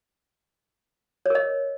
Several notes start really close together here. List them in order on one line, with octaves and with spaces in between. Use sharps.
C#5 A#4 D#5